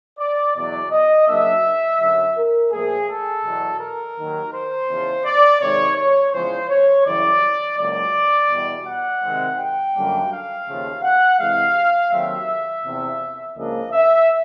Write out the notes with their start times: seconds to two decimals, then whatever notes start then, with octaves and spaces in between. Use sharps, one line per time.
0.19 D5
0.56 E2 B2 F#3 D5
0.91 D#5
1.28 C#3 F#3 A#3 D4 E5
2.00 F#2 D3 F#3
2.36 A#4
2.72 A#2 F3 A3 G#4
3.09 A4
3.44 E2 B2 F#3
3.80 A#4
4.17 D#2 D#3 F#3
4.53 C5
4.89 E2 C#3 F3
5.25 D5
5.61 C3 D#3 G#3 C4 D#4 C#5
5.97 C#5
6.33 E2 C#3 F3 G#3 C5
6.69 C#5
7.05 F#2 C#3 E3 G3 D5
7.78 C#2 C#3 F#3 A#3 D5
8.50 E2 B2 G3
8.86 F#5
9.23 C3 D#3 G#3 C4
9.58 G5
9.94 F#2 D3 G3 A#3 D4
10.31 F5
10.67 D#2 C#3 F3 A3
11.04 F#5
11.39 C3 E3 G#3 F5
12.11 D#2 D#3 F#3 A3 C4 E5
12.84 E2 C3 F3
13.56 C#2 C#3 F3 A#3 D4 D#5
13.92 E5